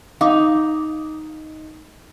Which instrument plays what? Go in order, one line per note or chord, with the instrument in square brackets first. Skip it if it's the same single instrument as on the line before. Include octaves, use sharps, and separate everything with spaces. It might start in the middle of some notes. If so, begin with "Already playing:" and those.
[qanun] D#4 [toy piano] F5 D6 D#6